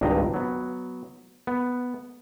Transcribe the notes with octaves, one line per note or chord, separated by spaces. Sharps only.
G#1 C#2 G2 D4 D#5 A#5
F#3 B3
B3